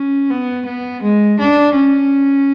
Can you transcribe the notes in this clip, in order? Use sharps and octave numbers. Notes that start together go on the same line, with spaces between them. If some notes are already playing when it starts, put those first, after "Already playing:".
Already playing: C#4
B3
B3
G#3
D4
C#4